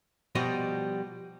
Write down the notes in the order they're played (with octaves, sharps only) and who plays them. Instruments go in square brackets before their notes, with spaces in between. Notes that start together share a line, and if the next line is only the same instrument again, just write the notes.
[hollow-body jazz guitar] B2 F3 G3 F#4 D#5